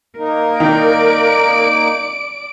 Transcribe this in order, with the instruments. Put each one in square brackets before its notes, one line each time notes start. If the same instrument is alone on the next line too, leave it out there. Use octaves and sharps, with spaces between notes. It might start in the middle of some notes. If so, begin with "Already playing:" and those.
[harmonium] A#3 D#4 [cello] A#4
[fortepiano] D#3 [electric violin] D5 D7